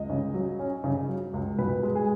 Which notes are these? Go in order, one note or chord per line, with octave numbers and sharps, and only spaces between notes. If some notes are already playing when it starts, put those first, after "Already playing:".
Already playing: C#2 D#5
C#3
F#3
C#4
C#3
F#3
C#2
B2 B4
G#3
G#4